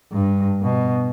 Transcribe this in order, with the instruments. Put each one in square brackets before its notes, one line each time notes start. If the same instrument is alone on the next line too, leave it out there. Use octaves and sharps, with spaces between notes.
[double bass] G2
B2